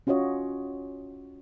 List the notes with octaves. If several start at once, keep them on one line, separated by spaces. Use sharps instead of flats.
C#4 F4 F#4 C#5 D#5